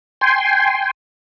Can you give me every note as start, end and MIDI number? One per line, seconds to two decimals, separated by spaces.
0.21 0.91 79
0.21 0.91 80
0.21 0.91 84